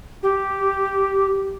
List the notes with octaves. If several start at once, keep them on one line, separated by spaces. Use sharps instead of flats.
G4